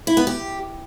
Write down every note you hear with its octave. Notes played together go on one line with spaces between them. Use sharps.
E4
B3
G4